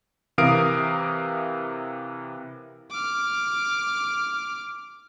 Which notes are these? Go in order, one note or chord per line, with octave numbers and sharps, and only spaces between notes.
C3 E3 A#4 F5 D#6 D7
D6 F6